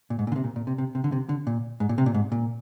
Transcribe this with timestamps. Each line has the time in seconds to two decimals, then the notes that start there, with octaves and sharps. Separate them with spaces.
0.10 A#2
0.19 G#2
0.27 A#2
0.32 D3
0.36 C3
0.44 A#2
0.56 A#2
0.67 C3
0.78 C3
0.95 C3
1.04 D3
1.12 C3
1.29 D3
1.47 A#2
1.80 G#2
1.89 A#2
1.98 C3
2.06 A#2
2.14 G#2
2.32 A#2